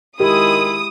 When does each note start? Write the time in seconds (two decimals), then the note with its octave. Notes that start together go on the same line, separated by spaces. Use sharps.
0.20 D#3 G#3 E4 G4 D#6